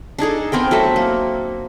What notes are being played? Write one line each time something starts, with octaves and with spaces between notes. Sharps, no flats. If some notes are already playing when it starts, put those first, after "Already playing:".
D4 D#4 G#4 A4
B3 C4 A#4 G5
F#3 A3 A4 E5
A#3